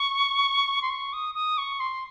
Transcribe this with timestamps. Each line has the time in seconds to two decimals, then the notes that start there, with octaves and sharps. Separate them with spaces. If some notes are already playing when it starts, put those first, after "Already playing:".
Already playing: C#6
0.82 C6
0.89 C#6
1.13 D#6
1.34 D#6
1.57 C#6
1.79 C6